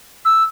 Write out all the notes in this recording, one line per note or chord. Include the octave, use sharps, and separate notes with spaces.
E6